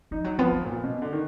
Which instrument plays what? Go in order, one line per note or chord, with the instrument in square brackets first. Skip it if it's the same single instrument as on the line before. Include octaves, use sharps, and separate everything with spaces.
[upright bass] F3 [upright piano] D#4
[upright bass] F#3
[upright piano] F3 [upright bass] B3
[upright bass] B3
[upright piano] A#2
B2
D3
D#3